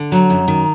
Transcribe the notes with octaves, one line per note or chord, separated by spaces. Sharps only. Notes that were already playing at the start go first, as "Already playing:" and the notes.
Already playing: D3
F#3 A#5
F#2
D#3